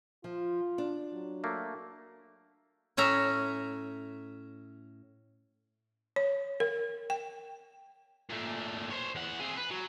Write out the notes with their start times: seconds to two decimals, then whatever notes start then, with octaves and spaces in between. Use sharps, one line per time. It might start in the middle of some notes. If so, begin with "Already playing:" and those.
0.24 F3 F4
0.78 D4
1.13 F#3
1.44 A3 A#3
2.97 A2 C#4 E5 A#5
6.16 C#5
6.60 A#4
7.10 G5
8.29 A#2 A3
8.91 C5 C#5
9.15 E2 F#5
9.40 C4 G#4
9.57 B4
9.71 F#3